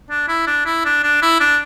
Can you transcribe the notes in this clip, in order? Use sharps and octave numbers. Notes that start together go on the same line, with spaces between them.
D4
E4
D4
E4
D4
D4
E4
D4